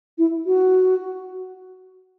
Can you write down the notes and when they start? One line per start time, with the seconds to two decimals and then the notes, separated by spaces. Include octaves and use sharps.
0.18 E4
0.46 F#4